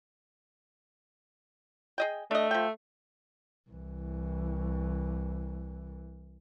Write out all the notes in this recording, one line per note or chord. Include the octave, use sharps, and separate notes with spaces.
G#4 D#5 G5
A3 D4 D#5
F3 G5
C2 E3